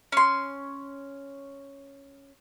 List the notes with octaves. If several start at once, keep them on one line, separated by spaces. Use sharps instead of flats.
C#4 C6